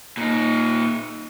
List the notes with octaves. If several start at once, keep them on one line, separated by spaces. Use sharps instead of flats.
A#2 D#4